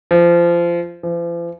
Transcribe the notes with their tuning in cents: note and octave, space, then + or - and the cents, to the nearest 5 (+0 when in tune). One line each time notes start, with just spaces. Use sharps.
F3 -25
F3 -45